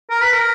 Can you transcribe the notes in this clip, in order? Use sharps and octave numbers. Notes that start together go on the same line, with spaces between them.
A#4
B4
A#4